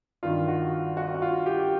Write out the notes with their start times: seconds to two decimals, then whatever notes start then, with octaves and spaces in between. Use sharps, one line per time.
0.23 G2 D#3 F4
0.48 F#4
0.97 F#4
1.14 F#4
1.22 F4
1.46 G4